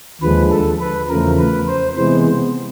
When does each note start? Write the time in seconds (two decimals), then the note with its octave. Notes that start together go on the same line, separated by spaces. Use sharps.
0.22 D#2 D3 F3 G#3 B4
0.51 A4
0.81 B4
1.09 E2 C#3 F3 A3 A#4
1.39 B4
1.68 C5
1.96 C3 E3 G#3 B3 C5